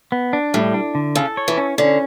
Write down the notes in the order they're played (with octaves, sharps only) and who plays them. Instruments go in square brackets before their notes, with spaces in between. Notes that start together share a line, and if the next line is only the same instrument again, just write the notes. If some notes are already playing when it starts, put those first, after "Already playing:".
[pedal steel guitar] B3
D4
[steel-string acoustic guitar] A2 [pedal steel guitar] G3
[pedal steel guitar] D4
D3
[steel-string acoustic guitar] C#3 [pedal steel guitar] A4
[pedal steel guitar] C#5
[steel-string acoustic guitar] E3
[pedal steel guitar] C#4
[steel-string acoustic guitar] D3 [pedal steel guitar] C#4